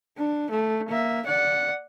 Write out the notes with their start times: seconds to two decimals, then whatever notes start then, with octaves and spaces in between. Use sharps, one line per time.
0.18 D4
0.51 A3
0.89 A#3 E5
1.26 D5 F#5